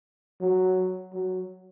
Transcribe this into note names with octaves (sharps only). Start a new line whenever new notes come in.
F#3
F#3